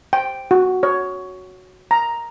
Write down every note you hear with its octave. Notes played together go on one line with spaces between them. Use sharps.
G5
F#4
C#5
A#5